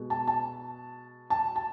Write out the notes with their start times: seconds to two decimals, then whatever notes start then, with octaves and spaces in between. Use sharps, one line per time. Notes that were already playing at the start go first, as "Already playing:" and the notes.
Already playing: B2 G#3
0.10 A5
0.27 A5
1.30 A5
1.56 A5